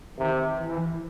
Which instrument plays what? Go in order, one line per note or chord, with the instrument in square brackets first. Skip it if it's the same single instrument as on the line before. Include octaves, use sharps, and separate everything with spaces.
[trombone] C3 [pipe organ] D#3
[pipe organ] E3